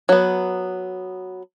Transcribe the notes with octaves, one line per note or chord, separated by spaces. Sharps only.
F#3 B3